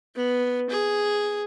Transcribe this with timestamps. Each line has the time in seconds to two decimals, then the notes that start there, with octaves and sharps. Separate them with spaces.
0.16 B3
0.70 G#4